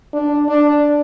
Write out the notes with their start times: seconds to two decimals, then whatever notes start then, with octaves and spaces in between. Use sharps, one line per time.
0.14 D4
0.49 D4